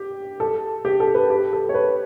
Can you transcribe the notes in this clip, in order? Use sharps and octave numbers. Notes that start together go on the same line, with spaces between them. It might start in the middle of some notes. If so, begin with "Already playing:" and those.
Already playing: G4
A4
G4
A4
B4
G4
A4
C#5
B4